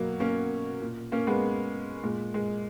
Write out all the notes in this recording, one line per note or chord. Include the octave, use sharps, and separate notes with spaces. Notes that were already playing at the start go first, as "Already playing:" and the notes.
Already playing: B2 F#3 A#3
A#3 C#4
A#2
A#3 C#4
G#3 B3
A#2 G#3
G#3